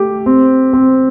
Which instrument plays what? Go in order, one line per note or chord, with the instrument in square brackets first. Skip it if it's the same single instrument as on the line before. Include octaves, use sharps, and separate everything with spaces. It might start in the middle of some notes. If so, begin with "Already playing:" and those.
Already playing: [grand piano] A3 G4
C4
C4